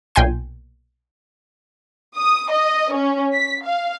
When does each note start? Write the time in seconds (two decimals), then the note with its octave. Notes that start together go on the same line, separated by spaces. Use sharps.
0.15 B1 A#2 G5 G#5 C6 D#7
2.17 D#6
2.51 D#5
2.94 C#4
3.33 B6
3.65 F5